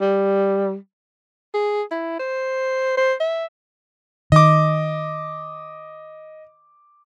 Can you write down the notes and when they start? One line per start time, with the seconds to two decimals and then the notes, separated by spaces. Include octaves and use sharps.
0.01 G3
1.54 G#4
1.91 E4
2.20 C5
2.98 C5
3.20 E5
4.32 D#3 D#5 D6